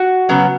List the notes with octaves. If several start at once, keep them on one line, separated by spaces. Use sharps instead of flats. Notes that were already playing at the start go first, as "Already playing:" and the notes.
Already playing: F#4
C#3 F#3 B3